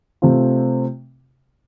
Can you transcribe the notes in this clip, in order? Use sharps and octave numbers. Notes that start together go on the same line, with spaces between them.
C3 A3 C4 F4